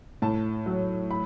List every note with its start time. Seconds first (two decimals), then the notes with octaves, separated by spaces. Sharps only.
0.22 A2 A5
0.66 F#3
1.11 B5